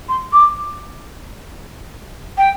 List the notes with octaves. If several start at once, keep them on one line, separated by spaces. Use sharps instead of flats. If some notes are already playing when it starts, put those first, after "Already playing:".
C6
D6
G5